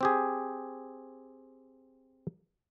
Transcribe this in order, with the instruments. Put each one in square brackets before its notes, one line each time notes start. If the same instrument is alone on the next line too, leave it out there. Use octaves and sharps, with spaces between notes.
[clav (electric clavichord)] C4 G4 G#4